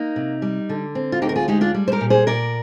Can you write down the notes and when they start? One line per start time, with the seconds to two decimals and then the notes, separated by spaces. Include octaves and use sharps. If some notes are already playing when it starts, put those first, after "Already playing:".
Already playing: A#3 D#4
0.16 C3
0.42 G3
0.69 D3
0.95 C4
1.12 F4
1.22 D2 D#4 G4
1.29 A#4
1.36 F4 G#4
1.48 G#3 D#4 G4
1.61 D4 F4
1.74 G3
1.88 C5
1.92 G4 A#4
2.01 A#2
2.10 G#4 C5
2.27 A#2 A#4 D5